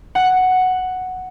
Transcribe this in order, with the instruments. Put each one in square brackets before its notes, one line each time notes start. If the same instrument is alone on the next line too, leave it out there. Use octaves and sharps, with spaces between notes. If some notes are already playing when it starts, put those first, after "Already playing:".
[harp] F#5